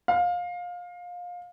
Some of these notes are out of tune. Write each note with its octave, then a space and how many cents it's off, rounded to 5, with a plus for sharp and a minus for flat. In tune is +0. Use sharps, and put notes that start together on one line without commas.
F5 +25